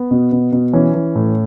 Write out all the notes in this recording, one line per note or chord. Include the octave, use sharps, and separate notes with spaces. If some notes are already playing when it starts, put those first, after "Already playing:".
Already playing: B3
B2
B2
B2
E3 C#4
E3
A2